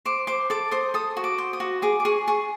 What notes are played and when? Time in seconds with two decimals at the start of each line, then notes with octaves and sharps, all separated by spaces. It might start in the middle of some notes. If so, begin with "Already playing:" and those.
0.06 C5 D6
0.27 C5 D6
0.50 A4 D6
0.71 C5 D#6
0.94 A4 D#6
1.17 F#4
1.24 D6
1.38 C5
1.53 D#6
1.60 F#4
1.82 G#4 D6
2.00 D6
2.05 G#4 C#6
2.28 G#4 C#6